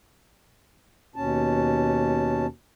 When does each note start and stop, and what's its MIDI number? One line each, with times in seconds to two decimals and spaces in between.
1.16 2.47 39
1.16 2.47 47
1.16 2.47 61
1.16 2.47 81